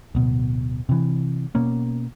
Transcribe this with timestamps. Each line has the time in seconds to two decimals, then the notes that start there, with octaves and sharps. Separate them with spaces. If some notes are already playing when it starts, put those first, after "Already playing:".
0.15 D1 B2
0.89 C3 E3
1.55 B2 A#3 C#4